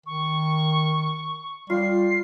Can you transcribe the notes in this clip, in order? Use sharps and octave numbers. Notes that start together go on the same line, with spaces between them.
D#3 C#6
G3 F4 C7